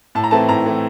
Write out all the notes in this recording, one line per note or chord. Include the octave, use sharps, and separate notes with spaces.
A2 A5
A#5
E3 A3 C4 A5
A2 A#5
E3 A3 C4